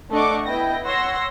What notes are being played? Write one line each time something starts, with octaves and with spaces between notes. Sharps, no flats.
A3 D4 D#5 F#5 C#6 D6
B3 E4 D#5 G5 A#6
C#5 F#5 C6 E6 A#6